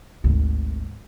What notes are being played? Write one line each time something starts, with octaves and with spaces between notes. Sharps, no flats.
G#1 D2